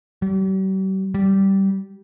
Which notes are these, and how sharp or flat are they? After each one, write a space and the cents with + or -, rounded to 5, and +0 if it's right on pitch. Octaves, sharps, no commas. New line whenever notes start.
G3 -45
G3 -15